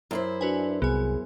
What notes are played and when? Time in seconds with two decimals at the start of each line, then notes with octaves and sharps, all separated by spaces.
0.11 F#2 E4 C5
0.41 D4 F#4 B4 G#5
0.82 C2 B3 G#4 G#5